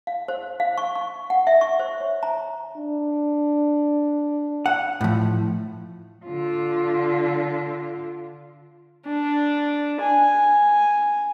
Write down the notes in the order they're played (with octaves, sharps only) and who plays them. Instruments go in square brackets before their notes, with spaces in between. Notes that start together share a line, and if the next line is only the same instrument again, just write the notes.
[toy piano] F5
C5
F5
C#6
C#6
F#5
E5
C#6
C5
C#5
A#5
[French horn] D4
[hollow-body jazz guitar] F#5
A2 F3
[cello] D3 F4
[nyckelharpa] D4
G#5